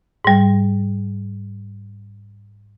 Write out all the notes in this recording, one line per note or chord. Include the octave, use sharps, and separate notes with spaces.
G#2 G3